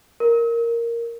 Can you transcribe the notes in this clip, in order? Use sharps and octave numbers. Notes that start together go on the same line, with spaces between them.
A#4